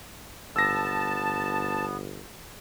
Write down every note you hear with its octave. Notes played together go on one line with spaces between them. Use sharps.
G1 B3 A5 E6 A#6